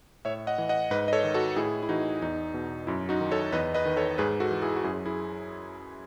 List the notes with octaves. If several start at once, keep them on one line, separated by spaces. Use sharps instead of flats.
A2 C#5 E5
D#5 F#5
E3
D#5 F#5
G#2 B4 D#5
D#5
A4 C#5
D#3
F#4 A4
A2 E4 G#4
E4
E3 D#4 F#4
E2 D#4
B2
F#2 E4
D#4 F#4
D#3
A4 C#5
E2 B4 D#5
B4 D#5
D#3
A4 C#5
G#2 G#4 B4
F#4 A4
E3
E4 G#4
F#4
F#2 E4 G#4
E4 G#4